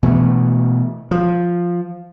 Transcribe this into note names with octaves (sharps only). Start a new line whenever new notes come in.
B2 E3 A3
F3